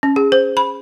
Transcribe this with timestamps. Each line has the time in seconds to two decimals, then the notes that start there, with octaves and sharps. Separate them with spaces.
0.03 C#4
0.16 G#4
0.32 C5
0.57 B5